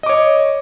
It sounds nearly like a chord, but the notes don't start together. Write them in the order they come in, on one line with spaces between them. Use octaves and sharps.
D#5 D6 C#5